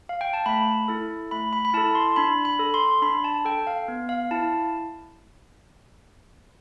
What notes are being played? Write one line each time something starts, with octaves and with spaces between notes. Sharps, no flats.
F5
G5
A5
A3 B5
E4 A4
A3 B5
B5
B5
E4 A4 A5
C6
D4 B5
B5
A4
C6
D4 B5
A5
A4 G5
F5
B3
F5
E4 A5